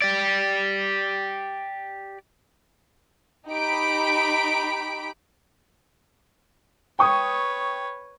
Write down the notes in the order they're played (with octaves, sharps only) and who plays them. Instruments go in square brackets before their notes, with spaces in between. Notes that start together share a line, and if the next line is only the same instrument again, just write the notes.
[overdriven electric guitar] G4 D5
[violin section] D#4 G4 B5 B6 D7
[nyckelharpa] B4 C#5 [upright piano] G5 C#6 D#6